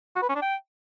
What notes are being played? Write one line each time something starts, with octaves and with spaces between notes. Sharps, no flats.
F#4
B4
C#4
D4
G5